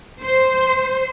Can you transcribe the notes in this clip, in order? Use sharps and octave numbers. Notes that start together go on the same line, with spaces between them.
C5